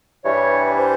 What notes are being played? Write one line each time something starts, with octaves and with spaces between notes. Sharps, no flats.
G2 E3 G3 C#5
C5